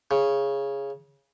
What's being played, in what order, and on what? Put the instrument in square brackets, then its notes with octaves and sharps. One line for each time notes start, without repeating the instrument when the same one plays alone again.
[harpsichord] C#3